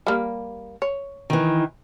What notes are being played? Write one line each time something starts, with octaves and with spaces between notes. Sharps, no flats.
G3 A#3
C#5
D#3 E3